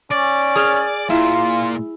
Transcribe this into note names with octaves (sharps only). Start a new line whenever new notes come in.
C#4 D5
G#4 F6
A#2 E4 F4